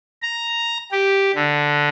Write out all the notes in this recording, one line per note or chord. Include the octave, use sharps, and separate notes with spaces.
A#5
G4
D3